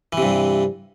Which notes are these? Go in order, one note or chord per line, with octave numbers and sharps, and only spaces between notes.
G2 C3 E3